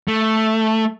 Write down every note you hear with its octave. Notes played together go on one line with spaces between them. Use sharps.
A3